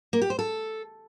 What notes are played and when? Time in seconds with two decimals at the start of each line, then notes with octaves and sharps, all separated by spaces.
0.13 A#3
0.22 G4
0.30 C5
0.39 A4